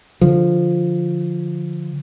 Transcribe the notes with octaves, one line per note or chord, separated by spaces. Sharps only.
D3 F3